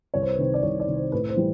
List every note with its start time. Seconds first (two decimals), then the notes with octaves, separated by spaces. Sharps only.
0.14 C2 C#5
0.22 C5
0.32 B4
0.38 C3 D#3 C5
0.54 D5
0.63 C2 C#5
0.80 D5
0.87 C3 D#3
0.96 C5
1.12 A2 B4
1.29 C5
1.36 E3 G3